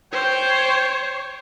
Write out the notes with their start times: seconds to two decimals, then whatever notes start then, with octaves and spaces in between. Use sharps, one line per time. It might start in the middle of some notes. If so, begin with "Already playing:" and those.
0.13 C5 C#5 G5